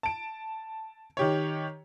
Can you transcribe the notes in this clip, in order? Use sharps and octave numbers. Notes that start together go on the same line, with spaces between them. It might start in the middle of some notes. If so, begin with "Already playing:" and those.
A5 D7
D#3 G4 C#5